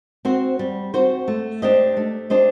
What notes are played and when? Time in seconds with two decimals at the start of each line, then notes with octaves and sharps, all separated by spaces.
0.25 C4 F#4 C5
0.59 G3
0.94 C4 F#4 C5
1.28 A3
1.62 D4 G4 C5 D#5
1.97 A3
2.30 D4 G4 C5 D#5